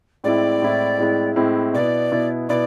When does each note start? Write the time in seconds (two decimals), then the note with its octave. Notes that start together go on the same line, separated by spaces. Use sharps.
0.24 A2 G#3 C4 E4 D5
0.62 A2 G#3 C4 E4
0.98 A2 G#3 C4 E4
1.36 A2 G#3 C4 E4
1.74 B2 B3 E4 D5
2.12 B2 B3 E4
2.49 B2 B3 E4 D5